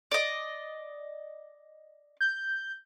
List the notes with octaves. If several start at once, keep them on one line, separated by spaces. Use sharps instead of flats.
D5 D#5
G6